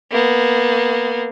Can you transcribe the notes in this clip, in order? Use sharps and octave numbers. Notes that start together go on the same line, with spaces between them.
A#3 B3